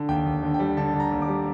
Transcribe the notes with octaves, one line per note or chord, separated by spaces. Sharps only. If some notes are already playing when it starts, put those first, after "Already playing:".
Already playing: D3
D#2 G5
D#2
D3
G5
G3
D3 A5
D3
A#5
D#2
D6
G3